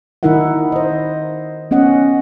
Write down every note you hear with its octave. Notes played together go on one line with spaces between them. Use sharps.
D#3 D#4 E4 A#4 E5 F#5
C5 D#5
B3 C#4 D#5 F#5